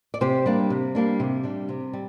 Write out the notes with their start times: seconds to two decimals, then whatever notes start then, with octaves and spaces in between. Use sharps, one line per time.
0.14 D5
0.21 C3 G4 C5
0.46 G3 A#3 D4
0.70 C3
0.95 G3 A#3 D4
1.20 C3
1.43 G3 D4
1.69 C3
1.93 G3